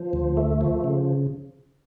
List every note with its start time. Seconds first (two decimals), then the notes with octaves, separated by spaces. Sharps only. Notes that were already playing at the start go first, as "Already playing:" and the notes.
Already playing: F3
0.13 D2
0.37 A3
0.61 F3
0.84 C#3